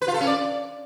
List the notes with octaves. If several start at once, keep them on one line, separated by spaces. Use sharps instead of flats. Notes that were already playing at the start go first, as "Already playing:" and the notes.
B4
F4
A4
C#4
D5